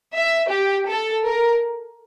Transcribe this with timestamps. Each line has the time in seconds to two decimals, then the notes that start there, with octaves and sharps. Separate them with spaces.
0.15 E5
0.51 G4
0.87 A4
1.25 A#4